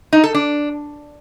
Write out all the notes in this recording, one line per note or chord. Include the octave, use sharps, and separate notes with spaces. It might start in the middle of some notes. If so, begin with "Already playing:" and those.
D#4
A4
D4